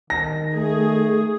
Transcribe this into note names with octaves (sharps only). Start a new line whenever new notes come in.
D#3 A#6
A3 G#4